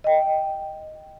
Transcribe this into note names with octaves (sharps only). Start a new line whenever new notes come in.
D#5 G5